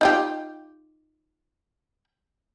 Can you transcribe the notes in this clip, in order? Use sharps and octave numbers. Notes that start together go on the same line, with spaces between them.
D#4 F4 G4